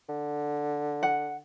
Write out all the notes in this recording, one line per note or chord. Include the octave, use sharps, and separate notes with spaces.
D3
F#5